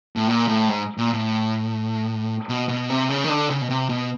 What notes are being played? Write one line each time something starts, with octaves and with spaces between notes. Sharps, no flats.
A2
A#2
A2
G#2
A#2
A2
B2
B2
C3
C#3
D#3
D3
C#3
B2
C3
B2